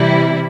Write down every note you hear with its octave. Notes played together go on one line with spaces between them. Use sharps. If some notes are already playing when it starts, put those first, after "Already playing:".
Already playing: C3 E3 G3 E4